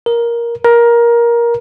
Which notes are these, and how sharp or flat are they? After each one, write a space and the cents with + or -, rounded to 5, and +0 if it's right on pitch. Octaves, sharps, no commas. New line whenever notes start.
A#4 +10
A#4 +15